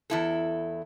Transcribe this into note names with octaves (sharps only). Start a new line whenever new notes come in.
E2 E4 A4